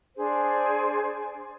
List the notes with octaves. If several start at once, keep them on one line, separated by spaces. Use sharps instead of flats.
D4 G#4 C5